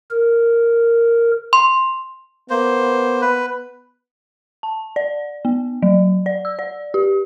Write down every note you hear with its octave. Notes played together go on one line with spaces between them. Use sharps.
A#4
C6
A#3 B3 C5
B4
A5
D5
B3
F#3
D5
E6
D5
G4